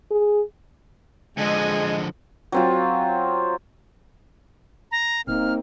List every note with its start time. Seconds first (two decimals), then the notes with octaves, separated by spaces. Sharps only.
0.11 G#4
1.38 D3 F3 G#3 D#5 G#5
2.52 F#3 C4 F4
4.91 A#5
5.27 D1 A#3 C4 D#4 F6